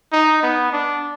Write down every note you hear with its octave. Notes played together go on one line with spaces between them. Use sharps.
D#4
B3
D4